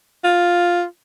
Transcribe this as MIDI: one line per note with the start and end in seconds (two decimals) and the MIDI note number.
0.24 0.84 65